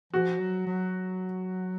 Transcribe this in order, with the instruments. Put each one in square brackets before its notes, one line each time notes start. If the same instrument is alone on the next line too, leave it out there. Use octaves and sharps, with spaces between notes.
[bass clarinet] F3 [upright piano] F#4
[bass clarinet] F#3
F#3